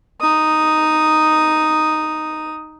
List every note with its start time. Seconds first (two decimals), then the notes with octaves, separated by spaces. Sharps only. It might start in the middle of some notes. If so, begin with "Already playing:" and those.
0.21 D#4 D#6